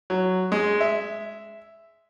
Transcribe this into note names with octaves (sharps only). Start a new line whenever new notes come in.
F#3
G#3
E5